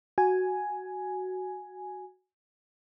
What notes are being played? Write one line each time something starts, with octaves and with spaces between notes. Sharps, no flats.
F#4 G#5